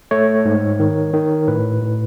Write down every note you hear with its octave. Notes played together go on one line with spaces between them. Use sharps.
A3 C#5
G#2
D#3
D#3
A2 B4
A2